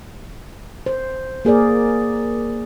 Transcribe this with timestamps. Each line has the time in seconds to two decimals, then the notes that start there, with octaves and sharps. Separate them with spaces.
0.86 C5
1.45 A#3 G#4 A#4 D5